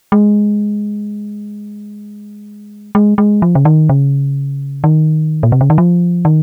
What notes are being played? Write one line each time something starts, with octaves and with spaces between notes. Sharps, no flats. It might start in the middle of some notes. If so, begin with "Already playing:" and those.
G#3
G#3
G#3
F3
C#3
D#3
C#3
D#3
A#2
C3
C#3
D#3
F3
D#3